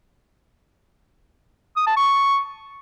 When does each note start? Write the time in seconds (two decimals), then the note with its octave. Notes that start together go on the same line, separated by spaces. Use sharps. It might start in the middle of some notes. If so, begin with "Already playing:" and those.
1.76 D#6
1.87 A5
1.97 C#6